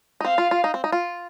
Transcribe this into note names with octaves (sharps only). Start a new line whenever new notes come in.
D#4
C4 F5
F4
F4
D#4
C4
D#4
F4